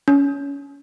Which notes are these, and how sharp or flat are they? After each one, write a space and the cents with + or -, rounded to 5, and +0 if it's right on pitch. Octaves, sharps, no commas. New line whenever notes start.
C#4 +20